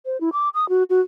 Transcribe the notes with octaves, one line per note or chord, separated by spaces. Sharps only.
C5
E4
D6
D#6
F#4
F#4